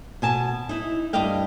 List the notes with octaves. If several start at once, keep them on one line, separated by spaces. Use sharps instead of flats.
B2 G#5 A5
D#4 E4
G2 E4 D5 D#5 F5 G5